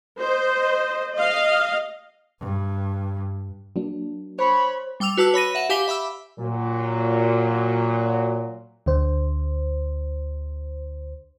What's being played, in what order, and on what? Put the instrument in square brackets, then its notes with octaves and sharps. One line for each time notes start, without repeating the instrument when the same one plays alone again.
[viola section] C5 D#5
D#5 F5
[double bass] G2
[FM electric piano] F#3 A#3 D4
[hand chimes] C5 [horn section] C#5 B5
[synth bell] G3 G5 D6 E6 F7
F#4 B4 A5 E6 F#6
C#5 B5 A#6 D#7
E5 F#5 E7
G4 F5 G#5 D6 B6 G7
E5 B5 D6 E6
[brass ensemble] A#2 F#3
[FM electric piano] D2 D3 C5